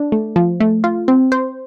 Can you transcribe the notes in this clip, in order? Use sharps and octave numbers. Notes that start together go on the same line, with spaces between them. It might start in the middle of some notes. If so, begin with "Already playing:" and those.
Already playing: D4
A3
F3
A3
F4
C4
C5